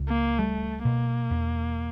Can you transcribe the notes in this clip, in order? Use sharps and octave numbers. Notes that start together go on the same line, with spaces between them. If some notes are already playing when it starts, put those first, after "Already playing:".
Already playing: C#2
A#3
G3 A3
B2 A#3
E2